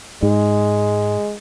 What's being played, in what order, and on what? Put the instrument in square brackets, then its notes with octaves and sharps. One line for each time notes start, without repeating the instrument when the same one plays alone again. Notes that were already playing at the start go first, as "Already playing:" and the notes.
[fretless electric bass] G#2 [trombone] G#3